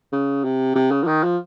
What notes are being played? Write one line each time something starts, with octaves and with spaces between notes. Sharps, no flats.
C#3
C3
C3
C#3
F3
D#3
F3